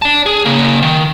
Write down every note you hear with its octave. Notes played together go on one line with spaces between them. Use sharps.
D5 A5
G#4
C#3 A#3
D#3